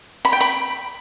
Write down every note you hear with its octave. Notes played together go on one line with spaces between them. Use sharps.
B5
G5
B5